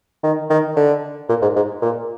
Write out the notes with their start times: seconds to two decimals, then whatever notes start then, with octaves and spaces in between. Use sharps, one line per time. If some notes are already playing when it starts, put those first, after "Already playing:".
0.23 D#3
0.50 D#3
0.76 D3
1.29 A#2
1.42 G#2
1.56 G#2
1.82 A#2